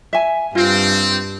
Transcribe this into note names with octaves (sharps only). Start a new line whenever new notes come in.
E5 G#5
G2 C4 F4